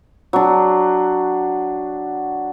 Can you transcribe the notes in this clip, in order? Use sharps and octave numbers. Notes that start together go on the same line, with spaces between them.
F#3 D4